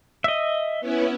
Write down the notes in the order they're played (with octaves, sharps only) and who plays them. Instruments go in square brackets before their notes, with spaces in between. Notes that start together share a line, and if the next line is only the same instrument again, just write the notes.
[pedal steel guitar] D#5 E5
[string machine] B3 C#4 E4